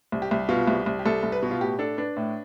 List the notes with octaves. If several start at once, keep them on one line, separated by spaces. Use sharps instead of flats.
C2
G4
C2
B2 F4
C2
C2
G4
C2 A4
C2
B4
B2
F4
A2 G4
D4 A4
D4 B4
A2